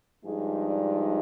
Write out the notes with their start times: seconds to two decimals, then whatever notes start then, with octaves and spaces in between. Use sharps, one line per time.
0.24 G2 F3 G#3 D#4 G#4
0.67 D5